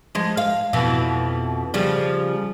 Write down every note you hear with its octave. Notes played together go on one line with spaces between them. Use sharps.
F3 G#3
F5
F2 B2 E3
C#3 F3 G3